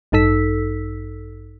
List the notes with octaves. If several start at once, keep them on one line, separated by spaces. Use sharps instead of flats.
A1 G2 D#4 A4 E6 B6